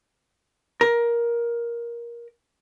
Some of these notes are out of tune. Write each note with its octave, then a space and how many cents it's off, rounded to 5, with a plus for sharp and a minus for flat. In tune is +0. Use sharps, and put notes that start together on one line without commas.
A#4 +15